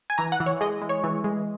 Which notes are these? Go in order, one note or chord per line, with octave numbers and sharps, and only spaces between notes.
G#5
E3 A#5
F#5
E3
C#5
G#3 D#5
G#3
C#5
E3
G#3